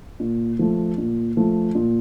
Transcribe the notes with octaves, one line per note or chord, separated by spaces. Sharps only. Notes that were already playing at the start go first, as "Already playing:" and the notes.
A#2
F3 A3
A#2
F3 A3
A#2